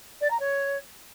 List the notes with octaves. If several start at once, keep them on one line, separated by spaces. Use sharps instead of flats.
D5
A#5
C#5